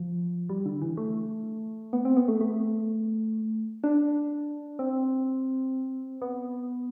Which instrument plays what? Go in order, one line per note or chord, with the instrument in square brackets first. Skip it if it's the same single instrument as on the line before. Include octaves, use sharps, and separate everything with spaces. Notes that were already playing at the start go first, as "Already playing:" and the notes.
Already playing: [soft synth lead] F3
G3
D3
E3
A3
B3
C4
B3
A3
A3
D4
C4
B3